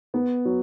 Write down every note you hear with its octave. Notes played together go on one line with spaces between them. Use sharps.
B3
F#3